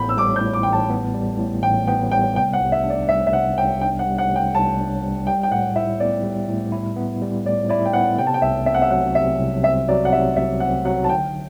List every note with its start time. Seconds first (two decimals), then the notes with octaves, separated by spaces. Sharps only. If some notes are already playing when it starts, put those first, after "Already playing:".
Already playing: A1 A2 B3 B5 G6
0.09 E6
0.17 G3 D6
0.36 G6
0.41 A2
0.53 D6
0.63 A1 G5
0.73 A5
0.90 B3
1.14 G3
1.38 A2
1.63 A1 G5
1.87 B3 G5
2.11 G3 G5
2.35 C3 G5
2.53 F#5
2.60 C2
2.72 E5
2.84 D4
2.90 D5
3.08 G3 E5
3.27 E5
3.32 C3 F#5
3.57 C2 G5
3.81 D4 G5
3.99 F#5
4.06 G3
4.18 F#5
4.31 C3
4.36 G5
4.55 C2 A5
4.79 D4
5.03 G3
5.27 G3 G5
5.43 G5
5.51 A2 F#5
5.76 E4 E5
6.00 B3 D5
6.24 G3
6.49 A2
6.72 E4
6.96 B3
7.22 G3
7.45 A2 D5
7.69 E4 D5
7.85 G5
7.93 B3 F#5
8.18 C3 G5
8.27 A5
8.34 G5
8.42 C2 E5
8.66 C4 E5
8.74 F#5
8.82 E5
8.90 F#3 F#5
9.15 C3 E5
9.39 C2
9.63 C4 E5
9.88 F#3 D5
10.05 F#5
10.12 C3 E5
10.36 C2 E5
10.60 C4 F#5
10.85 F#3 F#5
11.04 A5
11.09 D3 G5